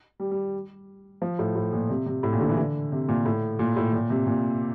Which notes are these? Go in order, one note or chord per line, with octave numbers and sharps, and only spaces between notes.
G3
G3
F3
A2
A2
A#2
C3
C3
A2
A#2
D3
E3
D3
C3
A#2
A2
A#2
A2
A#2
C3
A#2